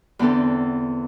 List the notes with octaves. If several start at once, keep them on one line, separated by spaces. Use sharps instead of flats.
E2 D3 B3 C4 A4